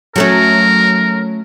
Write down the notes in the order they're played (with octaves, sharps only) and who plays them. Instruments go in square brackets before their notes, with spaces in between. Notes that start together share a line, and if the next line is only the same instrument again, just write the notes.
[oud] F#3 A3 C#4 [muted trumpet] A#4